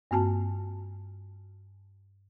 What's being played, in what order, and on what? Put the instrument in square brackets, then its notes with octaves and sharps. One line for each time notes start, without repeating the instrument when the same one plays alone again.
[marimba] G2 A#3 C4 F#4 G#5 A5